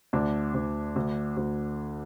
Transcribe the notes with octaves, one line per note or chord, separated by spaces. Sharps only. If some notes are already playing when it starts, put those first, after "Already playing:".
D2 D4
D2
D2
D2